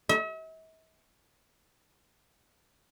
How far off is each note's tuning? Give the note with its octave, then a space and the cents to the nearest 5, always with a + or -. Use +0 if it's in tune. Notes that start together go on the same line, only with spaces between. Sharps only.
E5 -45